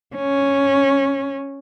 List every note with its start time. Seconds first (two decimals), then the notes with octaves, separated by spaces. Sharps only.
0.16 C#4